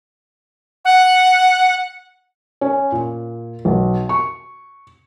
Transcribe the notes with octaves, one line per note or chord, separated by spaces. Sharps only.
F#5
C#4
A#2
B1
C#6